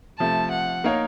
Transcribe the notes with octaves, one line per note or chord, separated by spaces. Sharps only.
C3 F3 A3 A5
F#5
A#3 D#4 A#4 C#5 F5